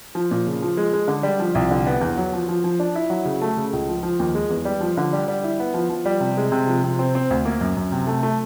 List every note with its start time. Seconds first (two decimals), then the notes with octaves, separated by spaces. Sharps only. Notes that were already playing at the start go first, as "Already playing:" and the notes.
0.15 F3
0.31 A#2
0.47 C#3
0.62 F3
0.77 G#3
0.93 G#3
1.08 D3
1.23 G3
1.40 F3
1.55 C2
1.71 D3
1.87 B3
2.01 E2
2.17 F#3
2.33 F3
2.49 F3
2.64 F3
2.79 D4
2.95 E4
3.10 F#3
3.25 C#3
3.42 A3
3.57 C#3
3.73 C#2
3.89 F3
4.03 F3
4.19 D#2
4.35 G#3
4.50 E2
4.65 G3
4.81 F3
4.97 D3
5.13 G3
5.28 G3
5.44 E4
5.60 B3
5.74 F3
5.90 F3
6.05 G3
6.21 C3
6.37 G#3
6.52 C3
6.67 F3
6.84 C3
6.99 C4
7.15 C4
7.30 D2
7.45 A#3
7.61 F#2
7.77 F#2
7.92 C3
8.07 A3
8.23 A3